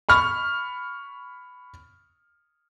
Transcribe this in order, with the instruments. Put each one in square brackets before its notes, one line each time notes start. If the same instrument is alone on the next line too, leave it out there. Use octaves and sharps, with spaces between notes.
[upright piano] B5 C#6 F6